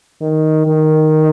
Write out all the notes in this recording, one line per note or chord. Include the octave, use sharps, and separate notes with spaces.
D#3
D#3